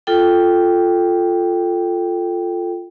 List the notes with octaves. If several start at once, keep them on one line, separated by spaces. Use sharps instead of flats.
F4 A4 G5